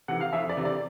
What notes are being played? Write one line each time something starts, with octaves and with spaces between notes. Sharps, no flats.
C3 E3 F#5
F5
F2 E5
D5
C3 E3
D5